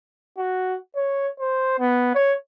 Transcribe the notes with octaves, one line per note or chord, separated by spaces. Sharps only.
F#4
C#5
C5
B3
C#5